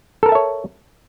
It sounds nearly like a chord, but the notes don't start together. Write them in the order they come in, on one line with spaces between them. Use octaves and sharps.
A4 A#4 A5 E5 C#5